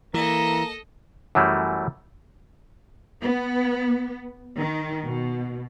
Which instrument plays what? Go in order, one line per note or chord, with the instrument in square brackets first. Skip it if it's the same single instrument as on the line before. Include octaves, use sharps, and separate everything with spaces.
[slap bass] E3 [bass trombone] A#3 [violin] A4 D#5 [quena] A#5
[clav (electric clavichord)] F#2 E3 F#3 G3 A3
[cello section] B3
D#3
B2